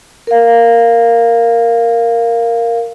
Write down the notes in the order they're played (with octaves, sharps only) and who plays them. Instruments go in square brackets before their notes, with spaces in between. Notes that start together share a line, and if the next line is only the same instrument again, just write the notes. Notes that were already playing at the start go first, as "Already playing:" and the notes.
[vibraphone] A#4 F5